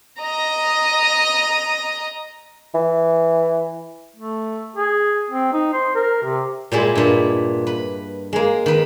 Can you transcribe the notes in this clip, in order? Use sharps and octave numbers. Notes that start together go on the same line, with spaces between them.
D#5 A#5
E3
A3
G#4
C4
D#4
C5
A#4
C3
A#2 G3 G#3 E4
G2 A#2
B4
G#3 A#3
D#3 B4